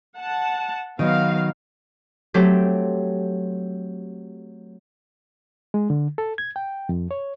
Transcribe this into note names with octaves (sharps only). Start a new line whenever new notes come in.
F#5 A5
D#3 F#3 B3 F5
F#3 A3 C4 G4
G#3
D3
A4
G#6
G5
F2
C#5